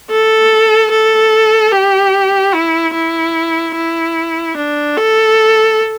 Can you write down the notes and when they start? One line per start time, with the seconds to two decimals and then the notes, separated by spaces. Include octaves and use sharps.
0.11 A4
0.92 A4
1.72 G4
2.54 E4
2.94 E4
3.76 E4
4.56 D4
4.97 A4